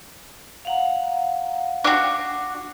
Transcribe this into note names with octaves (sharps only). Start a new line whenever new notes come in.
F5 F#5 A#5
D4 F#4